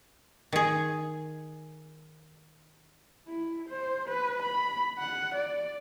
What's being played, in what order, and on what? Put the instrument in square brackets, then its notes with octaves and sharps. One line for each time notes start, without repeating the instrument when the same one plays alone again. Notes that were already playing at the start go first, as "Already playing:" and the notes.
[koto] D#3 G#4
[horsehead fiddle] E4
C5
B4
B5
F#5
D5